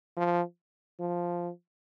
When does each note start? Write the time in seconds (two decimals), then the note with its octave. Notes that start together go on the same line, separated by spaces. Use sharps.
0.16 F3
1.00 F3